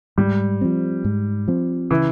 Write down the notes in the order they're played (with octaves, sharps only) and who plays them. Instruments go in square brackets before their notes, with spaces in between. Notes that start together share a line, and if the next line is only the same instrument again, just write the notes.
[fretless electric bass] G#2 [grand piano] G3
[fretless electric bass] F3 C4
G#2
F3 C4
[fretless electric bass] C#3 [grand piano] E3